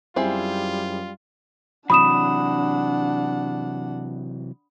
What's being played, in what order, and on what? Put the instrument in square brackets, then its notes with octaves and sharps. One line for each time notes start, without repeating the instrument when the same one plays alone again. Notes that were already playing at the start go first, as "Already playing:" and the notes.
[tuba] F#2 [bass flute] G3 [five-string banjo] C4 E4 G#4 [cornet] F4
[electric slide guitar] C3 E3 F#3 [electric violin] D4 F#5 [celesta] B5 D#6 E7